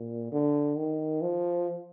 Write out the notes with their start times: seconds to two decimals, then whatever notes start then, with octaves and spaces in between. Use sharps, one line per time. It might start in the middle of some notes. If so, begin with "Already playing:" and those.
Already playing: A#2
0.32 D3
0.77 D#3
1.22 F3